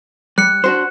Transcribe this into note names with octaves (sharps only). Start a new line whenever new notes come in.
G3 F#6 C#7
D4 F#4 C5